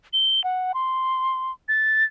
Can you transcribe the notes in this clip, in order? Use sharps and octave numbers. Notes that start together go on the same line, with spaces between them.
G7
F#5
C6
A6